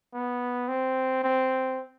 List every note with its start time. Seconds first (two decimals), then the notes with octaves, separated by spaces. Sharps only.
0.14 B3
0.68 C4
1.24 C4